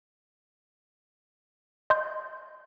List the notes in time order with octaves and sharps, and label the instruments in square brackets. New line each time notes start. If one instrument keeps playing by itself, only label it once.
[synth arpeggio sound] D#5 C6 G6